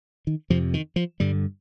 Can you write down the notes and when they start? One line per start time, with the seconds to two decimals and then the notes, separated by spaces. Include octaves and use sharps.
0.27 D#3
0.50 F2 C3 F3
0.74 D#3
0.96 F3
1.20 G2 D3 G3